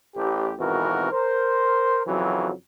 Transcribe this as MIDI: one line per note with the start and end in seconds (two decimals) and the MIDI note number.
0.16 0.51 33
0.16 0.51 67
0.60 1.08 32
0.60 1.08 41
0.60 1.08 47
0.60 1.08 52
0.60 1.08 66
0.60 1.08 70
1.12 2.02 70
1.12 2.02 72
2.07 2.49 41
2.07 2.49 49
2.07 2.49 52
2.07 2.49 54